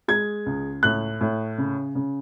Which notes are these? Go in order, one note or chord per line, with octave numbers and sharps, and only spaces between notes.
G#3 G#6
C#2
A2 F#6
A2
C#3
C#3